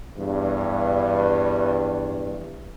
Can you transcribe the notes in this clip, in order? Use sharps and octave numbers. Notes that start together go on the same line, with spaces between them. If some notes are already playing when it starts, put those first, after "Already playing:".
E2 G2